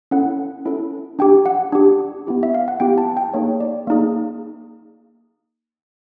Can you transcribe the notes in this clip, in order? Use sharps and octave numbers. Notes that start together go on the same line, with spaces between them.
C#4 E4 A4 F#5
C#4 E4 A4
D4 G4 G5
F#5
D4 G4
B3 E4 G4
E5
F5
F#5
B3 E4 G4 G5
A5
G5
A#3 D#4 G#4 C#5
D5
A#3 D#4 G#4